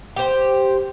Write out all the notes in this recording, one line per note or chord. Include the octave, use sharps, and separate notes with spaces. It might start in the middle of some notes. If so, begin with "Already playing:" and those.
G4 C5